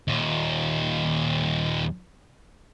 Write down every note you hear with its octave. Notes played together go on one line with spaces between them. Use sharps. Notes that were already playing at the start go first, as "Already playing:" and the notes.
D#2 A#2